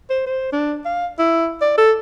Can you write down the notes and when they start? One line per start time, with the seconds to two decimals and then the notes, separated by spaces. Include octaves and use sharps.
0.10 C5
0.26 C5
0.53 D4
0.85 F5
1.19 E4
1.61 D5
1.78 A4